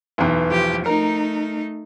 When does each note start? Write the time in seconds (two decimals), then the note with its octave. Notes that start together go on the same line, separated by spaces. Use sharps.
0.18 B1 E2
0.49 F3 G4
0.86 A3 D#4 A#4